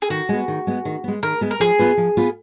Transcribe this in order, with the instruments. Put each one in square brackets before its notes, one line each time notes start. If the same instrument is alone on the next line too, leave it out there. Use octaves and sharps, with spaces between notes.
[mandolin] G#4
[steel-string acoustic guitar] D#3 [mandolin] F#4
[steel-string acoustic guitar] G#3 B3
D#3
G#3 B3
D#3
G#3 B3
[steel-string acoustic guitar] D#3 [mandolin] A#4
[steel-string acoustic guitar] G#3 B3
[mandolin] A#4
[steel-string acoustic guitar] F3 [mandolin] G#4
[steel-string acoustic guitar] B3 F4 B4
F3
B3 F4 B4